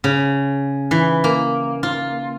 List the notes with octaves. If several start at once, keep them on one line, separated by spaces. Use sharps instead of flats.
C#3
E3
A#3
F4